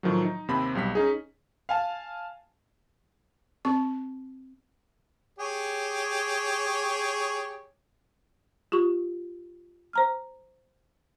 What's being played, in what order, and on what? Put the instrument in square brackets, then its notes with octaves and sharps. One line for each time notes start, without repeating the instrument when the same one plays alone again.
[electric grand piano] A2 D#3 F3 F#3
D#4
D#2 C3 C4 B5
B1 G3 B6
C#4 D#4 G#4
[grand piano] F5 G#5 A5
[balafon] C4 C#6
[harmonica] G4 G#4 C#5
[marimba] F4 G4 C#6
C5 A#5 F6